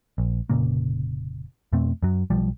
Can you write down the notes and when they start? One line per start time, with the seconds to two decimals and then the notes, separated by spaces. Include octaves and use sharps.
0.18 A#1
0.50 F1 A#2 C#3 A#3
1.73 F2 B2 A3 C4
2.03 F#2 F#3
2.30 B1 F3 G3